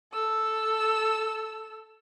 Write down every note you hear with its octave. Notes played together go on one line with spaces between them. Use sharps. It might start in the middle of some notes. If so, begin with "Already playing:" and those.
A4 E6